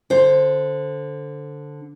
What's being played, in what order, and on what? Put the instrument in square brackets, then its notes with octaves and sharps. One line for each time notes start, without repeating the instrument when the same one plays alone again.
[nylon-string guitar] D3 C5